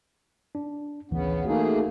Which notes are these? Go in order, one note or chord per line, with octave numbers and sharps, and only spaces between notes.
D4
A1 D2 C#3 E3 B3
A3 A#3 D#4 F#4 G#4